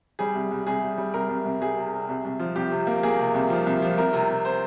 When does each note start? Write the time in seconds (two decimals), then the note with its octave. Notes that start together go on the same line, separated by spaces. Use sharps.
0.19 G3 G#4
0.35 C2
0.51 C2
0.67 C2 G#4
0.83 C2
0.98 G3
1.14 C2 A#4
1.29 C2
1.45 C2
1.61 C2 G#4
1.76 C3
1.93 C3
2.09 C2
2.25 C2
2.39 F3
2.56 C2 G4
2.71 C3
2.87 A#3
3.03 A#3 G#4
3.19 C3
3.34 C2
3.50 F3
3.66 C2
3.82 F3
3.98 C2 A#4
4.13 C3
4.29 C3
4.45 C5